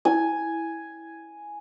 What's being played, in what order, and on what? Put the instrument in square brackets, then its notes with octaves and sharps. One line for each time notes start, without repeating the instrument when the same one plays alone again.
[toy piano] E4 [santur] G#5